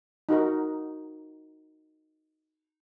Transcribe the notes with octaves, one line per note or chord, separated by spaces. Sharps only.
D#4 F#4 A#4